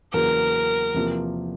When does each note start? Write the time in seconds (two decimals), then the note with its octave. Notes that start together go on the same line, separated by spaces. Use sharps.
0.13 E2 C#3 F#3 A#3 A#4
0.94 E2 C3 F3 A#3